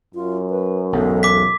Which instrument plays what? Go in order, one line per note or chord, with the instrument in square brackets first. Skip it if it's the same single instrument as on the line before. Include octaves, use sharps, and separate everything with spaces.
[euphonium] F#2 [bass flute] F4
[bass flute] B4
[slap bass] B1 E2 G#2 [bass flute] A4
[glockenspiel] D6 B6